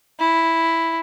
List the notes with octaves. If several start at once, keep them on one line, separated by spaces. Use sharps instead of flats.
E4